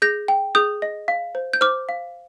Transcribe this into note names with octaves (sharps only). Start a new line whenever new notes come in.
G#4 G6 A#6
G5
G#4 D#6 G6
D#5
F5
C5
G6
C5 D6 F6
F5